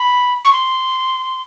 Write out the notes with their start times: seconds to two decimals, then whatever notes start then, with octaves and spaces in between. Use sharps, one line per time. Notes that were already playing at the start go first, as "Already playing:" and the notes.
Already playing: B5
0.45 C#6
0.52 C6